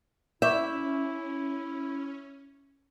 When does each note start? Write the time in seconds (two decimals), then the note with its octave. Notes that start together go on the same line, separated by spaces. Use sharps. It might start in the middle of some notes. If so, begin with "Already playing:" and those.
0.42 C#4 E4 E5 C#6 D6 G6